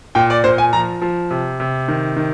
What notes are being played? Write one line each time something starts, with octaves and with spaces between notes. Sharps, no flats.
A#2 G5
D5
A#2 C5
G#5
F3 A#5
F3
C3
C3
D#3
D#3